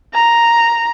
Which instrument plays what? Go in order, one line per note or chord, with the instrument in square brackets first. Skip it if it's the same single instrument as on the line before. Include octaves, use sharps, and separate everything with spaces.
[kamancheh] A#5